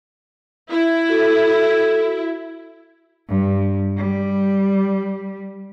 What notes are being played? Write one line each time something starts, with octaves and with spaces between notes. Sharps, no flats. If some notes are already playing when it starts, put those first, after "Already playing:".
E4
F#4 A4
G2
G3